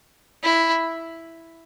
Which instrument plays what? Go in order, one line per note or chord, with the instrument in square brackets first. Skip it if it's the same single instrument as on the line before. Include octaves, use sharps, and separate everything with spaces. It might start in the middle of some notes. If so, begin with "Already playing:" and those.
[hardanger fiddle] E4